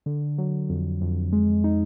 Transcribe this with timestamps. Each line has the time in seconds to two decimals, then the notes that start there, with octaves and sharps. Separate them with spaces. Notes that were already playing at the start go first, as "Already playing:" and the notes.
0.06 D3
0.38 F#3
0.69 F2
1.01 F2
1.32 G#3
1.64 D#4